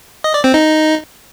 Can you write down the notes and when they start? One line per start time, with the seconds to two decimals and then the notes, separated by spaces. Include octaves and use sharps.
0.24 D#5
0.34 D5
0.44 C4
0.54 D#4